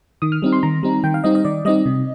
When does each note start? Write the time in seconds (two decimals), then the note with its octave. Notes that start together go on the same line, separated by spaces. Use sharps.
0.22 D#3 D#6
0.32 F6
0.42 G3 C4 D#4
0.53 C6
0.63 D#3 A#5
0.83 G3 C4 D#4
1.04 D#3 G5
1.14 F5
1.24 G3 C4 D#4 D#5
1.35 D#5
1.45 D#3 D5
1.65 G3 C4 D#4 D#5
1.86 C3